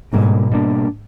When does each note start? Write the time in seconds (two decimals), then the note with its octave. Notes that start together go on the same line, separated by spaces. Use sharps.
0.13 G#2 B2 G3 A#3 D4
0.51 B2 G3 A#3 D4